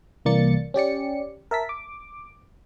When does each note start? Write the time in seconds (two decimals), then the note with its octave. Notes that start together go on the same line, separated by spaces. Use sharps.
0.25 C2 E3 A#3 D5 A6 C#7
0.74 C#4 G4 D5 C#7
1.51 A#4 E5 A5 B6
1.69 D6